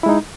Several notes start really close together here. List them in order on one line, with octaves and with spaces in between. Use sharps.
E4 G#3 D#4